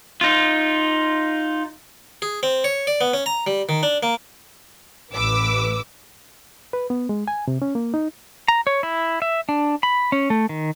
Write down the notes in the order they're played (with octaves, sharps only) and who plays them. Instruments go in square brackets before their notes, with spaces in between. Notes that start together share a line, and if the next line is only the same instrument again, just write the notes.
[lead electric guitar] D#4 F4
[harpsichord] G#4
C4
C#5
D5
B3
C#4
A#5
G3
D#3
D4
A#3
[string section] A1 B4 D6 E6
[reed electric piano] B4
B3
G#3
G#5
C3
C#4
A#3
D#4
[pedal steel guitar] A#5
C#5
E4
E5
D4
B5
C#4
A3
D#3